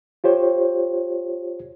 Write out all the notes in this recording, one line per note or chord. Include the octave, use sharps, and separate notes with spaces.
F4 G4 C5 C#5